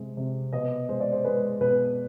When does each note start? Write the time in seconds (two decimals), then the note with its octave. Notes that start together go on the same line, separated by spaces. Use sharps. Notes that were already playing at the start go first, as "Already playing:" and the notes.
Already playing: C3 G#3
0.17 C3
0.53 B2 D#5
0.89 G#3 C5
1.00 D5
1.12 C5
1.25 G#3 B4
1.61 B2 B4